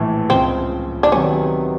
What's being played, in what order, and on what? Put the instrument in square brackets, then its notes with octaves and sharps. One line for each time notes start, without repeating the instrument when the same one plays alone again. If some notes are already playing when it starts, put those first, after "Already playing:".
Already playing: [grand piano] A#1 A2 E3 A3
[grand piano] C#2 C#3 F3 [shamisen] C4
[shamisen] D4
[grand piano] C3 D#3 F#3 B3 [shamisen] C#4